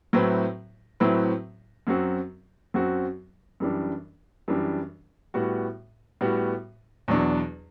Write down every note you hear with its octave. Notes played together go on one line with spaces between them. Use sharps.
A2 F#3 C4 E4 B4
A2 F#3 C4 E4 B4
F#2 F#3 C4 F#4
F#2 F#3 C4 F#4
F#2 E3 G3 D4
F#2 E3 G3 D4
A2 G3 B3 F#4
A2 G3 B3 F#4
E2 B2 F#3 B3 D4